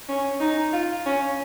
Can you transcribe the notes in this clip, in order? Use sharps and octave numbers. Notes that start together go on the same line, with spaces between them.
C#4
D#4
F4
C#4